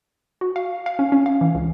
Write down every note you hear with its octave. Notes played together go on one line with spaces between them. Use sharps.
F#4
F5
F5
C#4
C#4
F5
E3
C#2